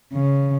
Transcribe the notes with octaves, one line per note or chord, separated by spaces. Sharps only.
C#3